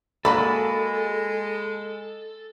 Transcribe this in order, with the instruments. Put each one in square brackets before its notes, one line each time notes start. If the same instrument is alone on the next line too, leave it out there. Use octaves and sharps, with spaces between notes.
[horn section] G#3 [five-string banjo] A#3 F#4 D#5 [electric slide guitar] A4 [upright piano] B5